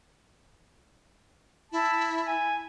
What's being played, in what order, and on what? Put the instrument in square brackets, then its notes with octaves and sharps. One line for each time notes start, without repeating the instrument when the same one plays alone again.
[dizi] E4 [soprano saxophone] A5
[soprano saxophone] G#5